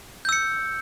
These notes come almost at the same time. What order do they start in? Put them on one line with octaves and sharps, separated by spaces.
G6 E6 C#7